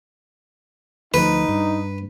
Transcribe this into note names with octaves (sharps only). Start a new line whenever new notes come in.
D2 F3 D#4 B4
G2